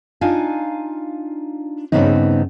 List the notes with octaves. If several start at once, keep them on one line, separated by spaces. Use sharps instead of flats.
D4 D#4 F4 F5 G#5
G2 A#2 C#3 B3 C4 D#4